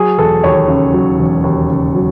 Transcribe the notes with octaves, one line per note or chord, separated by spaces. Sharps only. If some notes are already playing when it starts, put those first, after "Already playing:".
Already playing: F#3 G#4
E1 A4
D#2 C#5
C#3
F#3
E1
D#2
C#3
F#3